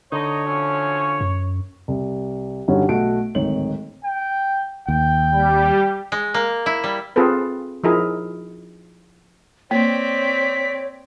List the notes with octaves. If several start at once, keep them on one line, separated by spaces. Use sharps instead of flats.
D3 D#4 C#5
F3 F#3 C#4
F#2
C2
G2 D3 F#3 G3 C#4 D#4
B1 A3 F#4 D#5 D7
D1 G#1 D#4 C#5 F#7
G5
D#2 G5
G3 G4
G#3
A#3
E4
G3
C4 F4 G#4 A4 B4
F3 D#4 E4 G#4 A#4
A#3 C4 C#5 D5 B6